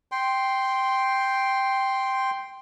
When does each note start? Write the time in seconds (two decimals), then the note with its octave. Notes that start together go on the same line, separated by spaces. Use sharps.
0.12 G5 C6